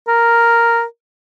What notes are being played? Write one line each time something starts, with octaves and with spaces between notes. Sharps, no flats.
A#4